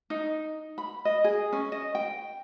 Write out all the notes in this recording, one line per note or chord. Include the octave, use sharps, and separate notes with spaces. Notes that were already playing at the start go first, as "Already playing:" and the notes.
D#4
B5
D#5
G#4
C#4
D#5
G5